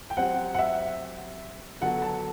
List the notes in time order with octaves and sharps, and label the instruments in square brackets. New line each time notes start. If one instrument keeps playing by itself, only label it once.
[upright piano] G5
[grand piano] F#3 C4 G4 C5 [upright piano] F#5
[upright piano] F#5
E5
[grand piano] D3 F#3 B3 F#4 A4 [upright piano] F#5
[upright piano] A5